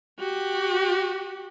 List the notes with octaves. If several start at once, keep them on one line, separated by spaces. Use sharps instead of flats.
F#4 G4